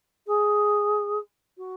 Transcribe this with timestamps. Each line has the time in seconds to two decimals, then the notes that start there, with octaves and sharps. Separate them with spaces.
0.27 G#4
1.58 F#4